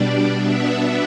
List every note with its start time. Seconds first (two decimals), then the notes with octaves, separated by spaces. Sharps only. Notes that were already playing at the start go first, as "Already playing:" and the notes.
Already playing: B2 G3 D4 D5
0.32 B2 B3 D4 E5